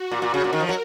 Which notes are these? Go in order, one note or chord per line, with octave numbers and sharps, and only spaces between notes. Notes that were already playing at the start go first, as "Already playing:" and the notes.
Already playing: F#4
A#2
A#2
C#3
A#2 A#4
D#3
F3
F#3